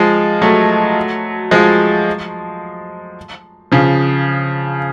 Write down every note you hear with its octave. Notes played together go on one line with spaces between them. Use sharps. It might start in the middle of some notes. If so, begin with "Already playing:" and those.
Already playing: F3 G#3
F#3 A3
F3 G#3
C#3 F3